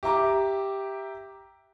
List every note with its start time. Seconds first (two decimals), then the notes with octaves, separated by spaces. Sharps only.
0.03 G4 E5 A#5 D6